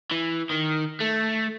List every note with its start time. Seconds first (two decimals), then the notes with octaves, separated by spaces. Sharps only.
0.11 E3
0.50 D#3
1.01 A3